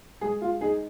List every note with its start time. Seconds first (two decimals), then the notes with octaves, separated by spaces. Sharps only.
0.21 G#3 G#4
0.42 F4
0.61 D#4 G#4